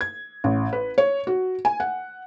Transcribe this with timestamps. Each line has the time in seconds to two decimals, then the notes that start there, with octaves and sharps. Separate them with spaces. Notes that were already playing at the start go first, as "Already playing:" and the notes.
0.01 G#6
0.44 A1
0.73 B4
0.98 C#5
1.27 F#4
1.65 G#5
1.80 F#5